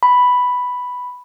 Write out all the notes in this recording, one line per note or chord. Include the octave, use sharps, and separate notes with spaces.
B5